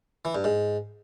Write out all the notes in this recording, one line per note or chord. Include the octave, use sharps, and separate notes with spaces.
E3
G2
G#2